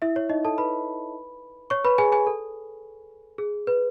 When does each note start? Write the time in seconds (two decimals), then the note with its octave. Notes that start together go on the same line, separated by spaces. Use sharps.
0.02 E4 E5
0.16 C#5
0.29 D#4 D#5
0.45 A4 A5
0.58 B4 B5
1.70 C#5 C#6
1.85 B4 B5
1.98 G#4 G#5
2.12 G#4 G#5
2.27 A4
3.38 G#4
3.67 B4